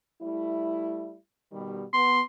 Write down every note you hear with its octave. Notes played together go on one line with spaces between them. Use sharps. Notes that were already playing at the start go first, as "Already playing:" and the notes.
G3 A3 E4
B2 D#3 G3
B3 C6